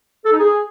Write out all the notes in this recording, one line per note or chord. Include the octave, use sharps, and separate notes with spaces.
A4
D#4
G#4